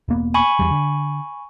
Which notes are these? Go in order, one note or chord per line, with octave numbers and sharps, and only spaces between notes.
E1 A#3 B3
G#5 B5 C#6
E2 G3
D3